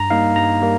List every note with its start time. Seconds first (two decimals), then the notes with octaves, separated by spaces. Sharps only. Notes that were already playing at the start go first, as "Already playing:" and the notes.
Already playing: G2 A#5
0.10 G3 A#3 D#4 F5
0.36 G2 A#5
0.62 G3 A#3